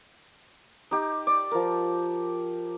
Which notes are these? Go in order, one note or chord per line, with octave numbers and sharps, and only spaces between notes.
D#4 G4
D5
F3 A#4